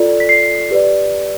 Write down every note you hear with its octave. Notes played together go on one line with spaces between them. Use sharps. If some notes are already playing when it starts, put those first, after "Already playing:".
Already playing: F4 A4 D5
B6
C7
G4 B4 D5